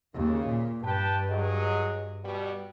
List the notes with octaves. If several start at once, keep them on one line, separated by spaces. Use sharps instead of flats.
D#2 C#3
A#2
G2 B4 G5 A5
F#3 G#4 D#5
B2 G3